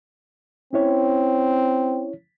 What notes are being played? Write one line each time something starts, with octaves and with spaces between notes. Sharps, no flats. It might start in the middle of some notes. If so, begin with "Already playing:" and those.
C4 C#4 E4 C#5